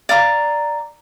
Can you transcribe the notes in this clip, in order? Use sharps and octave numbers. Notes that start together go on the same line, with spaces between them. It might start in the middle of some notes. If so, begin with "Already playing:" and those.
D5 F5 A#5 D6